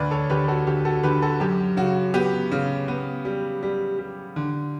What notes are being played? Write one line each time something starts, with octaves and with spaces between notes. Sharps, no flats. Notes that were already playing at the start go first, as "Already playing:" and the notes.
Already playing: D2 B4 D5
A4 C#5
D2 G4 B4
F#4 A4
D2 G4
F#4 A4
D3 G4 B4
F#4 A4
F#2 G4
C#3 F#4
B3 G4
C#3
B3
G3
G3
G3
D3